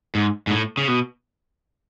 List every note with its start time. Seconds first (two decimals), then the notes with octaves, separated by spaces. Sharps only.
0.15 G#2
0.47 G#2
0.51 A2
0.77 C#3
0.88 B2